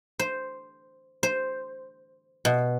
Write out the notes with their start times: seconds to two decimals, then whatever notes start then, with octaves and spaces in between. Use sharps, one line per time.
0.19 C5
1.23 C5
2.45 B2